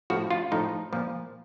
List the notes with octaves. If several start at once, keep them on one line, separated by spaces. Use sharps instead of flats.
A2 F3 F#4
F4
A2 F3 D#4
A#2 F3